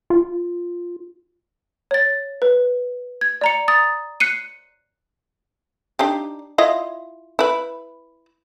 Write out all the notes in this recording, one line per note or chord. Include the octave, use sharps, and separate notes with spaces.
F4
C#5 A6
B4
G#6
D5 A#5 C#7
A#5 D#6 A6
F#6 C7 C#7 D#7
D4 D#4 G4
E4 F4 D#5
E4 B4